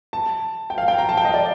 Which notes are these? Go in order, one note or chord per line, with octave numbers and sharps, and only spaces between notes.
A5
G5
F5
G5
A#5
A5
G5
D#5
D5